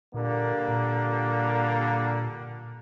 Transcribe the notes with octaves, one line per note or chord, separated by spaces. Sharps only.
A#2 D3 G3 A#3
A#2